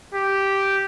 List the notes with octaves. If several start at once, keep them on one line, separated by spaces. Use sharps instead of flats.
G4